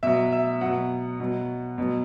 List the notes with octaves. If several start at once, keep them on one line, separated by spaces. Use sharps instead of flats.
B2 F#3 E5
E5
B2 F#3 F#5
B2 F#3
B2 F#3